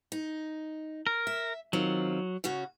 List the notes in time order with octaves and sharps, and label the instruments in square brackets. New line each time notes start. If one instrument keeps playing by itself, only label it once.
[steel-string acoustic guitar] D#4
[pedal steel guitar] A#4
[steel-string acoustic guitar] E5
[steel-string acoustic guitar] D#3 C4 F4 [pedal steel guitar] F#3
[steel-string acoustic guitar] C#3 C#4 F#4